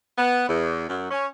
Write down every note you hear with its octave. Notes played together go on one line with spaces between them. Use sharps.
B3
E2
F#2
C#4